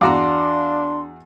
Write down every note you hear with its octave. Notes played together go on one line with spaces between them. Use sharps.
E2 D4 F#4 F5 A#5 C6 D6